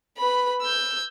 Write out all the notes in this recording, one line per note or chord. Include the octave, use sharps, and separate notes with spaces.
B4 B5
E6 G6